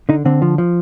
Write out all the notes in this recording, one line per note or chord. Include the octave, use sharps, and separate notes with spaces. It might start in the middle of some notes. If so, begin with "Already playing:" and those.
D3 D#4
D3 C4
F3
F3